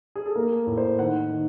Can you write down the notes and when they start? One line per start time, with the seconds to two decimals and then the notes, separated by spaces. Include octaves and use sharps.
0.16 G#4
0.26 A4
0.35 A#3 A#4
0.67 A2
0.78 C5
0.99 D#3 F#5
1.31 D#3